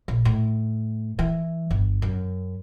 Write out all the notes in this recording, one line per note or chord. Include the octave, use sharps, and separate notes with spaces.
A#1
A2
E3
G1
F#2